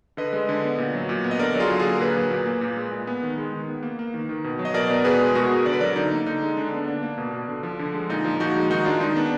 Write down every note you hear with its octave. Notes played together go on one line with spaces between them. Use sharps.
D3 B4 D#5
G#3
D3
B3
A#2
F#3
A#2
B3
D#5
D3 A#4 D5
F#3
F4 G#4
D3
F4 G#4
A#3
A#4
A#2 G#4 B4
F#3
A#2
A#3
A#2
G#3
A#2
B3
D#3
G#3
D#3
B3
A#3
A#3
D#3
D#3
B2
F#3
D#5
B2 A#4 D5
B3
B2 G#4 B4
G#3
B2 F#4 A#4
B3
D3 D5
B4
F#3 A#4 D5
D3 D#4
A#3
D3 D#4
G#3
D3 D4
B3 D4
A#3 D4
A#3
B2
B2
D3
F3
D3
G#3
A#2 D#4
F3
A#2 D#4 F#4
G#3
D#3 D#4 F#4
G#3 D4 F4
D#3 D#4
B3 D4